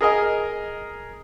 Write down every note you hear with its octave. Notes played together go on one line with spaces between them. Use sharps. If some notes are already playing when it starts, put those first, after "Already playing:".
G#4 A#4 D#5 G#5